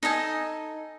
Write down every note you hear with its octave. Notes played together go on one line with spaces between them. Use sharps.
D#4 A4 D#5 G#5